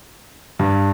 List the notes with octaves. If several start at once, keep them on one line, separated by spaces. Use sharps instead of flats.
G2